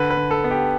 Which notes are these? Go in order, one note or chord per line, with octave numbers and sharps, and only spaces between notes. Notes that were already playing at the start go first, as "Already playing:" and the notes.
Already playing: D3 B4
B4
D3
A4
B3
G4